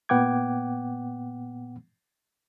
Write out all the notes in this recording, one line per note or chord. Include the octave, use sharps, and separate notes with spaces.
A#2 B3 F#5 G5 D6 G#6